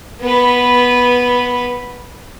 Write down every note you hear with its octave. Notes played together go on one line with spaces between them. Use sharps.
B3 B4